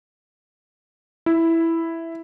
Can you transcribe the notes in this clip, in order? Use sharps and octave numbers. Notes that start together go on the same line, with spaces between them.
E4